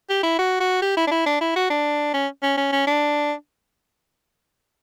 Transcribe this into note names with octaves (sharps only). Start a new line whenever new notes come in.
G4
E4
F#4
F#4
G4
E4
D4
E4
D4
E4
F#4
D4
C#4
C#4
C#4
C#4
D4